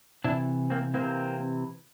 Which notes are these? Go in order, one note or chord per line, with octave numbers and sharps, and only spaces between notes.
C3 E3 D4 E4
A#3 C4
C3 E3 A#3 C4